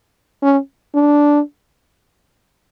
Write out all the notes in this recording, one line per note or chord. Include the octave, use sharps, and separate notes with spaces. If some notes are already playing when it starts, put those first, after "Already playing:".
C#4
D4